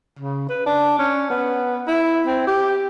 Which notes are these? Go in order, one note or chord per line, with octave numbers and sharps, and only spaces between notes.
C#3
B4
D4
C#4
B3
E4
C4
G4